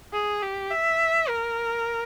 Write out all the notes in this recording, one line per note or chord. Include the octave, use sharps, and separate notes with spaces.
G#4
G4
E5
A#4